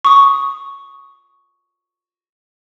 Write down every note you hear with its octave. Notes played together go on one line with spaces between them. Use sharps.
C#6 D#6